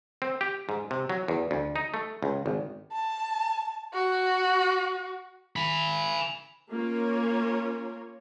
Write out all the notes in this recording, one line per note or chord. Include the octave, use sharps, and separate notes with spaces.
C4
G4
G#2
C3
F#3
E2
D2
D#4
A3
C#2
G#1
A5
F#4
G#5 B5
A#3 C#4 F4 A#4 C#5